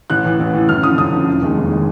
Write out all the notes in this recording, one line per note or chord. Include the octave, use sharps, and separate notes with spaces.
A1 F#6
A2 E3
A1
A2 E3
F#2 F6
D3 F3 D#6
F#2 D#6
D3 F3
F1
D#2 D#3 G#3
F1
D#3 G#3